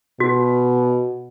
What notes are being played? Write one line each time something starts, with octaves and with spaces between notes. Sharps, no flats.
B2 F#4